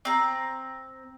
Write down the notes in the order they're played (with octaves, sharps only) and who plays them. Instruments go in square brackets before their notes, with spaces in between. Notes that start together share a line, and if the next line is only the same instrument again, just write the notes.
[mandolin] C4 A#5